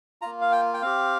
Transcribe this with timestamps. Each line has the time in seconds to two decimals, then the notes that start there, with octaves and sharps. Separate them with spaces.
0.22 A#3 F4 A#5
0.41 F5
0.52 G5
0.74 G5
0.82 C4 G4 F5